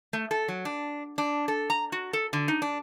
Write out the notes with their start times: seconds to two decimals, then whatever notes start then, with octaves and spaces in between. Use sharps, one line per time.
0.13 A3
0.31 A4
0.48 F#3
0.65 D4
1.18 D4
1.48 A4
1.70 A#5
1.92 F#4
2.13 A4
2.33 D3
2.48 D#4
2.62 D4